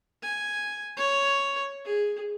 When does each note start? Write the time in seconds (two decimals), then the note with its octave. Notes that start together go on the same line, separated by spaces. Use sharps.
0.23 G#5
0.97 C#5
1.85 G#4